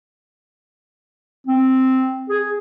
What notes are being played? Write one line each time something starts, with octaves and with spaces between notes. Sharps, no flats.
C4
G#4